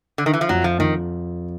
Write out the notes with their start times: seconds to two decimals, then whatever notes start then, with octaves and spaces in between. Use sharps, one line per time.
0.18 D3
0.26 D#3
0.33 E3
0.41 F3
0.49 F2 F#3
0.64 F3
0.79 F2 D#3